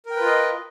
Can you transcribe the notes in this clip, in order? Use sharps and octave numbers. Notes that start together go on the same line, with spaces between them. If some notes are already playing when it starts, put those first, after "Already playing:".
F4 A#4 B4 D#5 G5